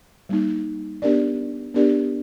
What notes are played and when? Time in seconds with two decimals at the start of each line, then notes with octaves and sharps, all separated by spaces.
0.29 G3 A#3 D#4
1.02 B3 D4 G4 A#4 D5
1.74 B3 D4 G4 A#4 D5